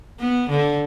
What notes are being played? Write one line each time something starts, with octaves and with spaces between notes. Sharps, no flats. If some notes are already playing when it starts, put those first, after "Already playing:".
B3
D3